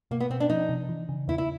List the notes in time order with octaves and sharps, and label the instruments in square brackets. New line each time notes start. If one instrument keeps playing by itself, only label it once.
[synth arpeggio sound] B2 [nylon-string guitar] A#3
[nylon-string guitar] B3
[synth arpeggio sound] B2 [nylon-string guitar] C4
[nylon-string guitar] D4
[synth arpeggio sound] F3 [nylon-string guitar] D#4
[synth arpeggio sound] C3
E3
C#3
[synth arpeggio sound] E2 [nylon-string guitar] E4
[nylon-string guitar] E4